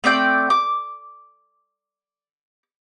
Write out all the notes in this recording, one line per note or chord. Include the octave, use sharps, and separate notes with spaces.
A3 C4 D5 G5
D6